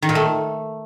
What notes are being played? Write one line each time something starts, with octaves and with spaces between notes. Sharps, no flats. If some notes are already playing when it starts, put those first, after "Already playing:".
D#3
A#2
A3